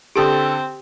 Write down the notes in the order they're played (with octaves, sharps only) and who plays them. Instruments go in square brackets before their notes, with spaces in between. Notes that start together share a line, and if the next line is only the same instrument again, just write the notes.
[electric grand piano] D3 A4 D7 [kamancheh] C4 [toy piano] G4 C6 D#6